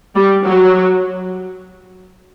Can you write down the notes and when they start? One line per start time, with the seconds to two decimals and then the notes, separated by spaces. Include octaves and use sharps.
0.16 G3
0.45 F#3